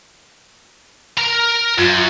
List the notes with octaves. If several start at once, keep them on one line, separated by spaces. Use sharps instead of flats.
A#4 A#5
F#2 F4